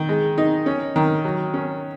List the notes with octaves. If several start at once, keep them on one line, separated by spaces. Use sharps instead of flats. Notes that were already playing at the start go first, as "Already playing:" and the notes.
Already playing: D#3
G#3
D#4
C#4
D#3
F#3
C#4